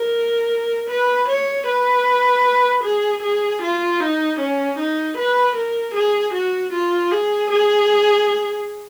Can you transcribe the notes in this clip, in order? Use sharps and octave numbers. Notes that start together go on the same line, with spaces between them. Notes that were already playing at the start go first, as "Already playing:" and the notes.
Already playing: A#4
B4
C#5
B4
G#4
G#4
F4
D#4
C#4
D#4
B4
A#4
G#4
F#4
F4
G#4
G#4